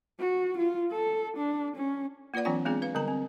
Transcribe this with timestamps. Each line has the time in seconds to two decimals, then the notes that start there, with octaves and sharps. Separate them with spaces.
0.19 F#4
0.58 F4
0.91 A4
1.37 D4
1.76 C#4
2.34 A#3 F4 B4 D5 F#5
2.45 E3 F#3 C4 D4 F4 G5
2.65 G#3 B3 C4 D4 F4 G#4
2.82 B4 F5
2.95 D3 G3 B3 A#5
3.08 C4